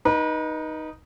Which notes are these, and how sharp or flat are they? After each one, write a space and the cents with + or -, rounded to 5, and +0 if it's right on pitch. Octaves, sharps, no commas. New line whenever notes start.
D#4 +0 B4 -35